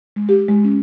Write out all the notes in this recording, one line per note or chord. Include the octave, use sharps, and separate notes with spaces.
G#3
G4
G#3
C#4